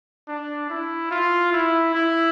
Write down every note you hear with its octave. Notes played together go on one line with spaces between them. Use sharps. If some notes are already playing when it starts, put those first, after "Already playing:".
D4
E4
F4
E4
E4